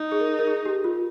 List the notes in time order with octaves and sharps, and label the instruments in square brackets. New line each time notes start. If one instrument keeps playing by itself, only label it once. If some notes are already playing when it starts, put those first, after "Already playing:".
Already playing: [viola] D#4
[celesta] G#4
A#4
A#4
G#4
G4
F4